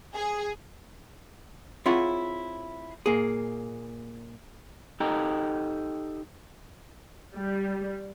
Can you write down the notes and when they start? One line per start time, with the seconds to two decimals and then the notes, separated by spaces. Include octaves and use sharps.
0.15 G#4
1.86 C4 E4 F4 G#4 C#5 F#5
3.06 A#2 A#3 G#4
5.00 D#4 G4 A4 D#5 G5 A#5
7.35 G3